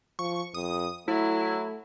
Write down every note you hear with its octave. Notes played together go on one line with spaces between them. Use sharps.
F3 C#6
F2 D#6
F#3 A3 E4